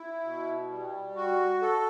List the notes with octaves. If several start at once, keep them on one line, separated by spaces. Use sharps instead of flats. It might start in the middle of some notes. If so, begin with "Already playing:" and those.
Already playing: E4
B2
G3
F#4
A4